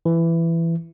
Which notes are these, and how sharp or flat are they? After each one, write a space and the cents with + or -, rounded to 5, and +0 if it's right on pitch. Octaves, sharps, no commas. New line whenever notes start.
E3 +15